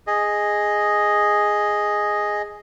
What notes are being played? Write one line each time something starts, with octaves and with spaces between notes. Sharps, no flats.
G#4 D#5